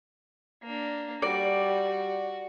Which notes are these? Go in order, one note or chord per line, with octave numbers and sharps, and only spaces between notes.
A#3 D4
G3 F#4 D5